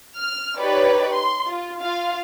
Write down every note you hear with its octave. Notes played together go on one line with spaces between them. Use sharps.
F6
D#4 G4 B4 C#5 D5
C6
F4
F4 F5